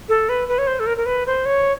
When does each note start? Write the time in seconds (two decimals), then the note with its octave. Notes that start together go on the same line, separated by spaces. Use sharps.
0.09 A4
0.29 B4
0.48 B4
0.58 C#5
0.67 C5
0.80 A4
0.86 A#4
0.97 A#4
1.06 B4
1.26 C5
1.46 C#5